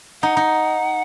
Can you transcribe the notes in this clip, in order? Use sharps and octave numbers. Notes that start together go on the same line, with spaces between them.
D#4 F#5
D#4